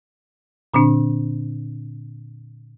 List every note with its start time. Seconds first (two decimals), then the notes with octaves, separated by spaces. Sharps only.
0.74 A#2 D3 C4 D4